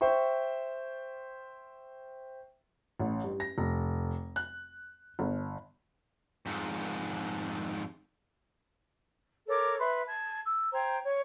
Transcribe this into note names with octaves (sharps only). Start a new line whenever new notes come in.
C5 E5 G5 C#6
A1
G2
A#6
F1
F#6
G1
F2 G#2
A4 A#4 C#5 D6
B4 E5 C6
A5 G#6
E6
C5 G5 A#5 G#6
C#5 G#6